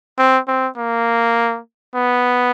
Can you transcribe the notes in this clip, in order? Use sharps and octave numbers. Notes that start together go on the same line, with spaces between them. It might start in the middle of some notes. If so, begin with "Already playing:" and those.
C4
C4
A#3
B3